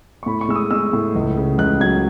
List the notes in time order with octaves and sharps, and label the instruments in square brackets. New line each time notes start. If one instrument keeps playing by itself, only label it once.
[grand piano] C#6
A2 B5
C#6
G#3 E6
D#6
G#3 E6
A2
C#2
C#3
C#2 F#6
F#3 G#6